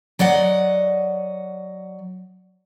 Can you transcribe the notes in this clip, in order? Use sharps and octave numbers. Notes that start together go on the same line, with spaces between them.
F#3 D5 D#5 F#5